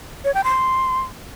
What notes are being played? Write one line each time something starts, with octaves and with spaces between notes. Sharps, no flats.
C#5
G5
C6